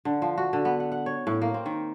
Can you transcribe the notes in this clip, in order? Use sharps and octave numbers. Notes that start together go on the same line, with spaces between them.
D3
F3
F#4
D3
B3
F#5
F#5
C#5
A2
A#3
C4
D#3